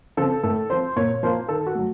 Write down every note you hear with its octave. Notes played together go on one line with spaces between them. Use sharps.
C#3 F3 C4 A4
A2 A4
F3 C4 C5
A#2 C#5
F3 A#3 F4 C5
D#3 A4
F#4
F#3 A3